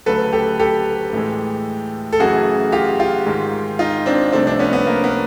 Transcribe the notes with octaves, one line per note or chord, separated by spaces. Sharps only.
D2 C#3 F#3 A3 A4 B4
G4 A4
G4 A4
A2 E3 G#3
A4
F#2 C#3 E3 A3 F#4 G#4
F4 G4
F4 G4
G#2 D#3 G#3
D#4 F4
C4 D4
C2 C3 F3 A3 C4 D4
C4 D4
B3 C#4
B3
A#3
B3